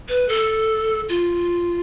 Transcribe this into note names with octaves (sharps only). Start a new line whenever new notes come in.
B4
A4
F4